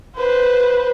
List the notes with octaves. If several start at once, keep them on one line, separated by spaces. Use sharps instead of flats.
B4 C5